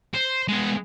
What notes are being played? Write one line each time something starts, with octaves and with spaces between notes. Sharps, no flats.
C5
G#3 B3